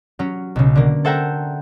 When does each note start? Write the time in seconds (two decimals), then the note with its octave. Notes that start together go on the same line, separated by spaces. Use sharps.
0.19 F#3 C#4
0.56 B1 C#3
0.76 D3 A#3
1.05 A4 C5 E5 F#5 G5 A#5